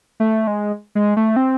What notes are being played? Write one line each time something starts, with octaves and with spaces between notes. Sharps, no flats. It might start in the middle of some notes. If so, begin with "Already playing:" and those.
A3
G#3
G#3
A3
C4